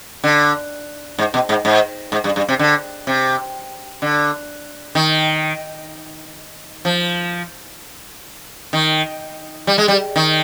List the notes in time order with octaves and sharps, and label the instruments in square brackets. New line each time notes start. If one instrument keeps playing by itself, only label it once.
[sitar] D3
G#2
B2
G#2
G#2
G#2
G2
G2
C3
D3
C3
D3
D#3
F3
D#3
G3
G#3
G3
D#3